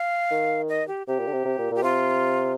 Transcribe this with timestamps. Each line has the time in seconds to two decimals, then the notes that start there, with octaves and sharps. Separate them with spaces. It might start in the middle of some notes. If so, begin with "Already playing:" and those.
Already playing: F5
0.31 D#3
0.69 D#5
0.88 G4
1.07 C3 G4
1.20 A#2
1.27 D3
1.33 C3
1.45 C3
1.58 A#2
1.71 A#2
1.75 G4
1.83 C3 F4